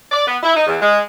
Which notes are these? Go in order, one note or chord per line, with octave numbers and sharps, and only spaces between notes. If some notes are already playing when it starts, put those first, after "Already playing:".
D5
B3
E4
D#4
E2
G#3